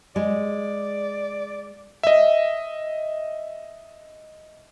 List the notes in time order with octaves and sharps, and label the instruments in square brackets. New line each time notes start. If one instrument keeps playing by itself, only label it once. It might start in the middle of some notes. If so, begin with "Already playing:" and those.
[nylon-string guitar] G#3 [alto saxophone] D5
[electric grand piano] D#5 E5